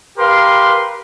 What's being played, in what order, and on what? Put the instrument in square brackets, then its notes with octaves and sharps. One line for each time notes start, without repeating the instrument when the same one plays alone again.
[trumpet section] G4 A#4 B4 F5 C6